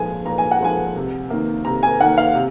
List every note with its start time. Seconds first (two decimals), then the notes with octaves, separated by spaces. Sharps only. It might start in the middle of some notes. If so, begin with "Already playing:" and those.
Already playing: A#2 F3 G#3 G#5
0.25 A#2 A#5
0.38 G#5
0.51 F#5
0.60 F3 G#3 G#5
0.96 C3
1.30 D#3 A#3
1.65 C3 A#5
1.83 G#5
2.00 D#3 F#5
2.04 A#3
2.18 F5
2.35 C3